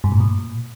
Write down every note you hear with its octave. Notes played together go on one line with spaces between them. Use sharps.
G2
A2
A#2